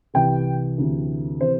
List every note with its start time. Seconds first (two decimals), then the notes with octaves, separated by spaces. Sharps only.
0.14 C2 C3 E3 G5
0.78 D2 C3 E3
1.41 C3 E3 C5